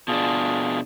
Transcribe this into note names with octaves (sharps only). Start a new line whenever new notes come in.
B2 D4 F4 G#4 A5